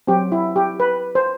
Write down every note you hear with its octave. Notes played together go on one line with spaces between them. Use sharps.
F#3 C4 G4
E4
G4
B4
C5